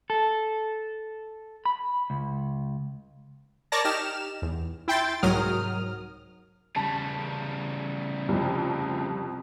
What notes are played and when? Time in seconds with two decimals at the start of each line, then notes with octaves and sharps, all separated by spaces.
0.10 A4
1.65 B5
2.10 C#2
3.72 A#4 C#5 D5 A5 A#6
3.85 D#4 G4 F6 E7
4.42 E2
4.88 E4 G5 C6 A6
5.23 C2 G#2 F#3 A#4 D#6 F6
6.76 C#3 G3 A5
8.28 C2 F2